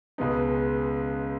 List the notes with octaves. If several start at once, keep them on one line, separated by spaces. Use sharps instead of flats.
C#2 B2 G#3 B3 D#4